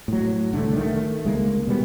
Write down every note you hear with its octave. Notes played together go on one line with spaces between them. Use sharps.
A2 F#3
C2 D3 A3
D#3 A3
C#2 G#3 A#3
B2 G3 B3